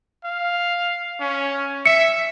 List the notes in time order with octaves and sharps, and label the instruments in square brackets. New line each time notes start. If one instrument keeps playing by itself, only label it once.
[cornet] F5
C#4
[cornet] E5 [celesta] C#7